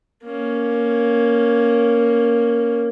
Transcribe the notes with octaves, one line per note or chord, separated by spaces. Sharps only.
A#3 C#4